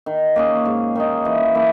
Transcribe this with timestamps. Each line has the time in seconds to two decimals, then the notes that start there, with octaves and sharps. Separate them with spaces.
0.06 D#3
0.36 A#3 C#4 G#4
0.65 G#2
0.95 D#3 A#3 D#4
1.25 E3
1.55 A#3 E4